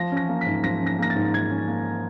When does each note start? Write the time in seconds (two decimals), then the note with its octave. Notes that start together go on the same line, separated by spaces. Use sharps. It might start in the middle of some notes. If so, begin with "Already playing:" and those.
Already playing: F3 A#6
0.12 C#4 A#6
0.29 A#3
0.41 G#2 B6
0.64 F3 A#6
0.81 C#4
0.86 A#6
0.99 A#3 A#6
1.10 A6
1.16 G#2
1.34 F3 G#6
1.50 C#4
1.68 A#3